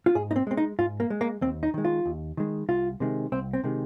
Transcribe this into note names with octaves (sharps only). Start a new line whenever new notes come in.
F4
G#2 G#4
D#4
C4
G#3 C4
D#4
G#2 F4
A#3
G#3
A#3
D#2 C4
D#4
D#3 G#3
F4
D#2
D#3 G#3
C2 F4
C3 D#3 G#3
C2 C4
C4
C3 D#3 G#3